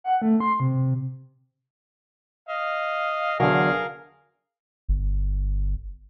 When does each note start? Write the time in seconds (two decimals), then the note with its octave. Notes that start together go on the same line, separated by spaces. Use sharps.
0.04 F#5
0.22 A3
0.40 C6
0.60 C3
2.49 D#5 F5
3.40 E2 D3 F#3 G#4 A#4 F5
4.88 G1